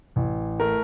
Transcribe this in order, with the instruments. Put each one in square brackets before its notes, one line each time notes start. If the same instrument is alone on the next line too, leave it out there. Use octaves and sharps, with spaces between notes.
[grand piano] A1
A3 A#4